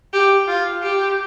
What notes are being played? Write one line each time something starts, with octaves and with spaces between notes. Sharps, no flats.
G4
F4
G4